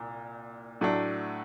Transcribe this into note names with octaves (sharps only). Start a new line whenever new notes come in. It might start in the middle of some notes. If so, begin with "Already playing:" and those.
Already playing: C2 A#2
A2 F#3 A3 D4